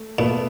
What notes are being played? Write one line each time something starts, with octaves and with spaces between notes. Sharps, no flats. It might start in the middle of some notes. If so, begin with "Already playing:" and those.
Already playing: A3
A#2 A3 B3